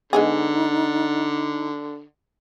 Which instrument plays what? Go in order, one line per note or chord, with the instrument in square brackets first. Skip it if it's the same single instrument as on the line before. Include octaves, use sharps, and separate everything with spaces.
[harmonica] D3 [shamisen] G#3 B3 G#4 [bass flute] D#4